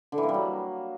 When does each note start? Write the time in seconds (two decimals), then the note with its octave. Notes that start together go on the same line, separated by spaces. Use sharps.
0.12 D3
0.18 E3
0.23 A#3
0.29 G3
0.34 F#3